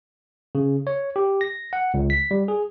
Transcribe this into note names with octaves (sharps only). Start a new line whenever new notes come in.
C#3
C#5
G4
A#6
F#5
C#2
B6
G3
G#4